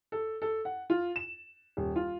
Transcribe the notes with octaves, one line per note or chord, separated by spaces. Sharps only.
A4
A4
F#5
F4
E7
D#1
F4